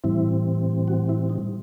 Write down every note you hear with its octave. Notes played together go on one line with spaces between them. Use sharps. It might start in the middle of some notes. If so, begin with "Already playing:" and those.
A2 E3 G3 C4 E4
F#4
E4
D#4